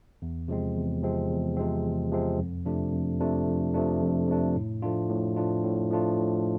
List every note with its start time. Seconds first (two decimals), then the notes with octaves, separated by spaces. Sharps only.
0.22 E2
0.48 C3 F3 G#3 C4
0.76 E2
1.03 C3 F3 G#3 C4
1.30 E2
1.57 C3 F3 G#3 C4
1.84 E2
2.11 C3 F3 G#3 C4
2.39 F2
2.65 C3 F3 A3 D4
2.93 F2
3.20 C3 F3 A3 D4
3.47 F2
3.74 C3 F3 A3 D4
4.02 F2
4.28 C3 F3 A3 D4
4.56 A2
4.82 F3 A3 D4 F4
5.09 A2
5.37 F3 A3 D4 F4
5.64 A2
5.91 F3 A3 D4 F4
6.18 A2